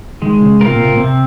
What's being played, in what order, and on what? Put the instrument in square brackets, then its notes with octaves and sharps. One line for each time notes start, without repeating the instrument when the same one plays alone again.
[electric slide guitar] D#3 [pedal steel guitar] G#3
[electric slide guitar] C#3
[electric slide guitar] C3 [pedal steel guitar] C4 F4 A#4
[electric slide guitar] A#2
C3
A#2
[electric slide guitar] C3 [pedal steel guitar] C4